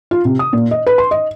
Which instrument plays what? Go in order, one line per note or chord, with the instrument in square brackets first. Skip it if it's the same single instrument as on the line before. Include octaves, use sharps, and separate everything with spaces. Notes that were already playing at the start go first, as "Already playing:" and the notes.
[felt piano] F4
C3
D#6
A#2
D#5
B4
C6
D#5